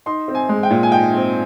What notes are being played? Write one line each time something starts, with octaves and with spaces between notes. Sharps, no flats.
D#4 C6
C4
G#5
G#3
G5
A#2
G#5
D#4 G5
C4